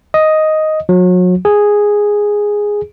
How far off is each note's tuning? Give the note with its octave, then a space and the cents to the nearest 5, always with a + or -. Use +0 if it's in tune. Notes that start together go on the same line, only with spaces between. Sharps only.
D#5 +5
F#3 -35
G#4 -5